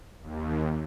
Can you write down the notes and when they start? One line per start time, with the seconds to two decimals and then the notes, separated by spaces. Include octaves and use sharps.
0.22 D#2